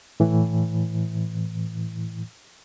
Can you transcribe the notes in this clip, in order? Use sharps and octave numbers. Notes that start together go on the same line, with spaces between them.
A2 E3